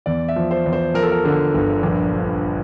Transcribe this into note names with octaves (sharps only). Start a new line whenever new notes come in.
E2 D5
E5
F3
C5
E2
C5
F3 A#4
A4
A#4
D3
G1
A#1
F3